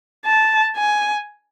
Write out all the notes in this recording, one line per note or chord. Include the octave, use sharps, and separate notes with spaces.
A5
G#5